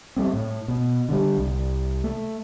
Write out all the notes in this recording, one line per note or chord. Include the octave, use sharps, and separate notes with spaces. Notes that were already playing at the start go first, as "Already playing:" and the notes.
G3 A3 C4
A2
B2
D3 G3
C2
A3